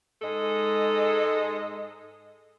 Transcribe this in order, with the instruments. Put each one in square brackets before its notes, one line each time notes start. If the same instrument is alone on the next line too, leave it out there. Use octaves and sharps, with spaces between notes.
[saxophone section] G#2 G#3 A4 D#5